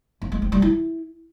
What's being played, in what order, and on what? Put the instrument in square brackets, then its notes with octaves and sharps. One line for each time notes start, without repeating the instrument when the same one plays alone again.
[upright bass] B3
G#3
C4
G3
E4